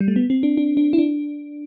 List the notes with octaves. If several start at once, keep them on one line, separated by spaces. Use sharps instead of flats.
G3
A3
B3
C4
D4
D4
D4
E4
D4